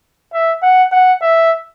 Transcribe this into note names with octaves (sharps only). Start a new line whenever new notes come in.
E5
F#5
F#5
E5